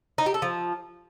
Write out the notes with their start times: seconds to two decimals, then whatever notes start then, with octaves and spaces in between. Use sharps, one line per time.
0.18 D#4
0.26 G4
0.34 A4
0.42 F3